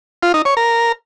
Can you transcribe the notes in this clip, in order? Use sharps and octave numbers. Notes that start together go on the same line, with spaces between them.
F4
D#4
C#5
A#4